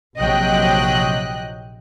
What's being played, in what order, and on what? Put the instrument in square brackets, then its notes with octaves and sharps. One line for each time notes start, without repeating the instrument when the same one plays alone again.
[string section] A#1 C3 F#3 D#5 G5 F#6